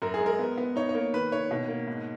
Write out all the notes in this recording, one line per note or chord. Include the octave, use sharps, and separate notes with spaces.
F#2 A#4
G#4
G#3
A#4
B3
B3
D#4 C#5
C#5
A#3
D#3 B4
D#3 C#5
B2
A#3
G#2